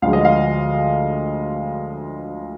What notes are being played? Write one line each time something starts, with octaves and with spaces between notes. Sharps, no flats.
D2 D3 F3 G#3 F5
D#5
F5